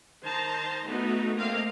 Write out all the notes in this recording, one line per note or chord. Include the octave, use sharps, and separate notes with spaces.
D#3 C5 A5 A#5
A3 B3 D#4 F#4
A3 A#3 C4 D#5 F5